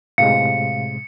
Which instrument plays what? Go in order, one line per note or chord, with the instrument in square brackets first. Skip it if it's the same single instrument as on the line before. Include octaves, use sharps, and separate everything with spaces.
[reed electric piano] A2 C3 G#3 [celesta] F5 [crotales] C#7